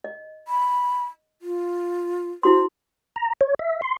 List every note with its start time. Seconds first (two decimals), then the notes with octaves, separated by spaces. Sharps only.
0.04 D#5
0.48 B5
1.42 F4
2.43 E4 F#4 C5 C6
3.16 A#5
3.41 C#5
3.59 E5
3.82 C6